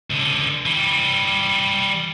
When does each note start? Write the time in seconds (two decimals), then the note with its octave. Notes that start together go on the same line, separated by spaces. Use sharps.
0.10 C#2 D3
0.66 E3 G3